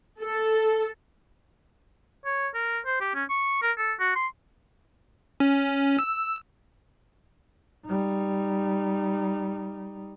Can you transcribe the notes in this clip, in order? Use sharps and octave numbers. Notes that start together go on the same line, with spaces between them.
A4
C#5
A#4
C5
G4
C#4
C#6
A#4
A4
F#4
C6
C#4
E6
G3 D#4